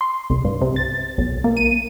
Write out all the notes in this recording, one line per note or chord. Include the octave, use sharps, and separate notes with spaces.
C6
C2
G2
C3
A6
B1
A#3
D#7